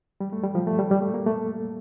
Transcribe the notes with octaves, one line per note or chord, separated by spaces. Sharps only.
G3
A3
G3
F3
A3
G3
G3
A3
A#3
A3